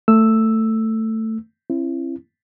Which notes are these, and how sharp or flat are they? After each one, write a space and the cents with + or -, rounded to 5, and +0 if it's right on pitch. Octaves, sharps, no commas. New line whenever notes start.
A3 +15 E6 +0
C4 +45 E4 +25